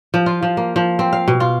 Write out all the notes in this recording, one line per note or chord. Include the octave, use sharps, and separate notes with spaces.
F3
F4
F3
A#3
F3
C4
F5
B2
F4